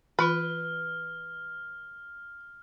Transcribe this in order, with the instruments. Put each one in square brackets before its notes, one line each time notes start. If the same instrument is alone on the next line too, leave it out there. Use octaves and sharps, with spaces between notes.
[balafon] E3 F4 B5 [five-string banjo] B4 [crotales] F6